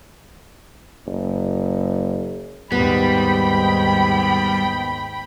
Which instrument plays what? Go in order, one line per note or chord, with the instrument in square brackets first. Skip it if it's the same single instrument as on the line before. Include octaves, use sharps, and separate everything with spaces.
[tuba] F#1
[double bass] D#2 G#2 [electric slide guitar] G3 [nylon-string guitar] B3 [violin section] G5 B5